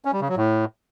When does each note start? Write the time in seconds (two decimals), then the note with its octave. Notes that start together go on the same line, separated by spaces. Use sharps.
0.05 C#4
0.13 G3
0.21 C#3
0.29 F#3
0.37 A2